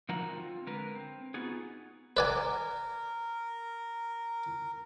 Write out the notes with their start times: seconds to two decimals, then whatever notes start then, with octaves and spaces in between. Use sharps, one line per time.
0.09 D3 F3 D#4 F#4 A#4 A#5
0.29 C4 F4
0.67 D3 G#3 A#4 B4
0.95 C4
1.34 B3 D#4 F4 F#4 G#4
2.17 A#4 B4 D5 G#5